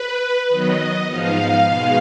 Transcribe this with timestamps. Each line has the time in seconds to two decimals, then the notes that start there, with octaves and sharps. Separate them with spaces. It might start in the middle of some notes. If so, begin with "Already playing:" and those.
Already playing: B4
0.49 D#3 F#3 B3 D#5
1.08 G#2 F3 B3 D#4 F5
1.67 B2 G#3 B3 D#4